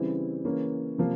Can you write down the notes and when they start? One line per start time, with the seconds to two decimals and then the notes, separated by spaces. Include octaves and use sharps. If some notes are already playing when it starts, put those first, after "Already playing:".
Already playing: C#3 E3 G3 C4 E4
0.45 C#3 E3 A#3 C#4
0.98 C3 F3 A#3 F4